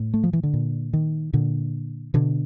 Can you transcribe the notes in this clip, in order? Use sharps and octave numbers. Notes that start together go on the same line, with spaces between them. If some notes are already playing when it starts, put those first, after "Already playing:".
Already playing: A2
A3
F3
E3
D3
A#2
D#3
A#2 D3
B2 D3